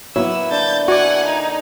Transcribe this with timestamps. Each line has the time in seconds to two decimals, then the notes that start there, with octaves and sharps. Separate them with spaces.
0.16 F#3 A#3 B3 E4 E6
0.51 D3 G6 A6
0.88 F#4 D5 F#5 G#5
1.26 D#4